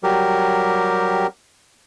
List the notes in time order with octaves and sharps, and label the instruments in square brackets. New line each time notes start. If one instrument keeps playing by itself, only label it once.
[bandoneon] F#3 G3 G4 A#4